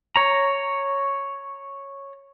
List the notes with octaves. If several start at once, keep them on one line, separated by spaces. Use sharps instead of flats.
C#5 A#5